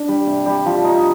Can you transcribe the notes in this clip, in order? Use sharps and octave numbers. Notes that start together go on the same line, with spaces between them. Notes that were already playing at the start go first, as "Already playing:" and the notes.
Already playing: D4
G3
C3
G3
F3
D#4